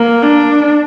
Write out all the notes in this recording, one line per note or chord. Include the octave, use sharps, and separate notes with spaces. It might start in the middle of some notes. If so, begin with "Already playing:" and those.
Already playing: A#3
D4